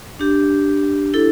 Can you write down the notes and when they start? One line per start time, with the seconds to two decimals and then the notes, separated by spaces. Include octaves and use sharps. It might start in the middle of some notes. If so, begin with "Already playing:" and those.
0.19 D4 G4
1.14 E4 A4